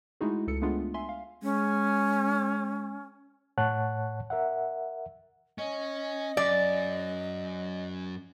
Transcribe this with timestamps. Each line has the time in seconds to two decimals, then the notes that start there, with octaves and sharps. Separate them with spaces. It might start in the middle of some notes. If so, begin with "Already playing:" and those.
0.21 G#3 A3 D#4 E4 F#4 G#4
0.47 C#2 A4 C#7
0.62 G#3 A3 B3 D4 F4 G#4
0.94 E5 G#5 C6
1.09 F5
1.43 G#3 C#4
3.58 A2 C#5 F#5 A5 F#6
4.30 A#4 E5 F#5
5.58 C#4 D#5
6.37 F#2 D5